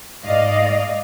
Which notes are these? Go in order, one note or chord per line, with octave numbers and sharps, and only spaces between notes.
G#2 D5 D#5 F5